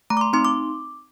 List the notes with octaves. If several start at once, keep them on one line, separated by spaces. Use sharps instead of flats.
A3 A#5
D6
C6
C4 D#4 C6
D6